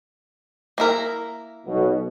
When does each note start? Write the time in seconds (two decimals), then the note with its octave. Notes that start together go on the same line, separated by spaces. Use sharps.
0.78 A#3 E4 A#4
1.67 B1 B2